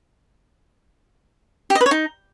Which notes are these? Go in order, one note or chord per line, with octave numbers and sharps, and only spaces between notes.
G4
D#5
B4
C#5
D#4